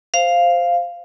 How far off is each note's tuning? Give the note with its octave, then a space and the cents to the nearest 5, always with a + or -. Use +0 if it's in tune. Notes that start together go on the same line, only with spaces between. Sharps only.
C5 +0 F5 -5